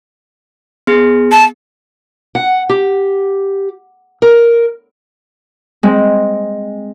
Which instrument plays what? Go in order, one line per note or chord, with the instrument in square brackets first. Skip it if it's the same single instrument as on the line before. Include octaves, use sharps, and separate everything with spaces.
[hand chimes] B3 G#4
[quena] A5
[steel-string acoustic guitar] F#5
G4
A#4
[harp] G#3 C4